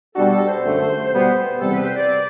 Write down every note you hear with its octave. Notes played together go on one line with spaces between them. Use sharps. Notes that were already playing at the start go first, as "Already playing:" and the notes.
B2 G3 D4 F#4 A4
A4
C5
F#2 D3 A3
B2 G3 B3
E2 C3 G3 B3 A4
B4
C5
D5